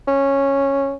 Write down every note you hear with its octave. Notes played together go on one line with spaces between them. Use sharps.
C#4